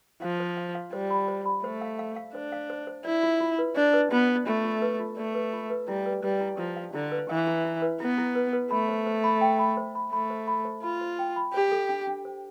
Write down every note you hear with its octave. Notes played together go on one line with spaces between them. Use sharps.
F3 F5
C5
F5
F5
G3 C5
B5
C5
B5
A3 C5
F5
F5
F5
D4 C5
F5
C5
C5
E4 D5
F4
F4
B4
D4 D5
B4
B3 F4
D5
A3 F4
F4
B4
F4
A3 D5
B4
F4
B4
G3 E4
B4
G3 B4
E4
F3 E4
F5
D3 E4
B4
E3 F5
E4
E4
B4
B3 E4
E4
B4
B4
A3 B5
C5
C5
B5
G5
B5
C5
B5
A3 B5
C5
B5
C5
F4 B5
C5
G5
B5
G4 C5
A4
D4
D4
C5